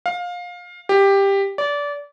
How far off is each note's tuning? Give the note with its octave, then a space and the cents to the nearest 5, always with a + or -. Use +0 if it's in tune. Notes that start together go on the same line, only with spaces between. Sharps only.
F5 +20
G4 +10
D5 -25